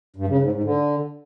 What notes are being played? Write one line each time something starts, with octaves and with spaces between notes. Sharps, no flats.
G2
C#3
G#2
G#2
D3